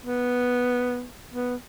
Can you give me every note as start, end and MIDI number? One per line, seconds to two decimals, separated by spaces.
0.05 1.04 59
1.33 1.55 59